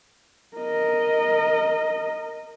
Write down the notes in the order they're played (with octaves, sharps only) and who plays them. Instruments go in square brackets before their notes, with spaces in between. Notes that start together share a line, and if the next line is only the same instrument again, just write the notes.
[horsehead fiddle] A#4 D#5